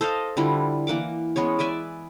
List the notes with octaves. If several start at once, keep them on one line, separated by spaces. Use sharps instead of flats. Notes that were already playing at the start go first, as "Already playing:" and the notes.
A4 C5 D#5 F5
D3 G3 E4 F4
E3 A#3 F#5 D6
G#3 B3 C#4 C#5
B4 D5 E5 G#5